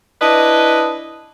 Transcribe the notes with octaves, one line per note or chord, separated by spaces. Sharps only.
D4 E4 B4 D#5